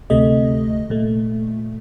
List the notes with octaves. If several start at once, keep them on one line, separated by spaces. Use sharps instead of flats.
D2 C3 A3 D#5
A#2 A3